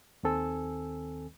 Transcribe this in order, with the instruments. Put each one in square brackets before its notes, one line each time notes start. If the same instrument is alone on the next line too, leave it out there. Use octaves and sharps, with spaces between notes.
[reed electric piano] D#2 D#3 C4 A4 G#5 E6